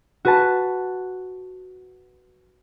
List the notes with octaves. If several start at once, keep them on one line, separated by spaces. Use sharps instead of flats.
F#4 B4 A5